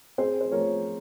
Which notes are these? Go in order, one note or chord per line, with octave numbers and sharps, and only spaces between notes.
C4 G#4 C5
C5
F3 A#4 C#5